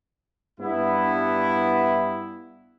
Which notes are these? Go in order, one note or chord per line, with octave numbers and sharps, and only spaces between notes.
G2 B3 E4